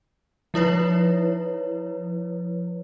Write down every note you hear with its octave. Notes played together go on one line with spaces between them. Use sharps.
F3 E4 B4 C#5